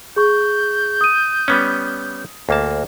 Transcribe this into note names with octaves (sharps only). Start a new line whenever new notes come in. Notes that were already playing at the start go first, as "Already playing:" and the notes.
G#4 C#6 G6
D#6 D#7
G3 B3 C#4
D2 A#3 A5